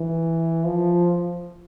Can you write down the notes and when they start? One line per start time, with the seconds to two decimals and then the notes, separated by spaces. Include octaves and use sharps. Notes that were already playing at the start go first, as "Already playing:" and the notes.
Already playing: E3
0.66 F3